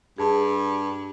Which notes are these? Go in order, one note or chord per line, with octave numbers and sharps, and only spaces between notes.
G2 G#4 A5